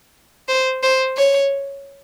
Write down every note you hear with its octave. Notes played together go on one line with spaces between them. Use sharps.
C5
C5
C#5